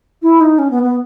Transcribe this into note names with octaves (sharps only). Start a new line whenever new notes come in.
E4
D#4
C#4
B3
B3